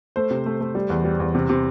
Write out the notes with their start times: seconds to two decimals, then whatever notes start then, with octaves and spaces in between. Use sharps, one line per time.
0.16 A3 C5
0.31 C3
0.46 A3
0.61 A3
0.75 G3
0.90 E2
1.05 G3
1.20 E2
1.35 C3
1.49 C3